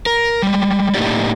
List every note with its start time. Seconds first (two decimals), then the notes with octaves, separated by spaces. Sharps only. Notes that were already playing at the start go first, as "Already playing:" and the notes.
0.06 A#4
0.43 G3 G#3
0.94 A2 A#3 D#4 G4 D5